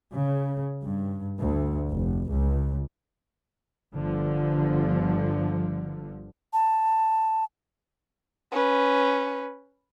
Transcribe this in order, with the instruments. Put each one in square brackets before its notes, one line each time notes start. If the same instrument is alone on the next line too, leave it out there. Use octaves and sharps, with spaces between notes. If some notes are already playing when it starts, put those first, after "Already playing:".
[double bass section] C#3
G2
D2
F1
C#2
G1 D3 F3
[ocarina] A5
[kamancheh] C#4 B4